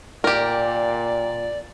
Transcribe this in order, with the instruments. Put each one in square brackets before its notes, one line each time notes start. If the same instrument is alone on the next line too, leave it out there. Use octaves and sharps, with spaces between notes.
[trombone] A#2 [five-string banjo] G4 A#4 [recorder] D5